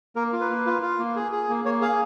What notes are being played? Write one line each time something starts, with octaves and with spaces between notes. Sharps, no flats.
A#3 A#4
F4
B4
A#3
F4
F4
A#3
G#4
G#4
A#3
A#3 C#5
G#4 F5